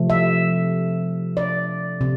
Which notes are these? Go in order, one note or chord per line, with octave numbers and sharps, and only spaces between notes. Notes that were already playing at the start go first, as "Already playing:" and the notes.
Already playing: C3 F3 A3
E5
D5
C3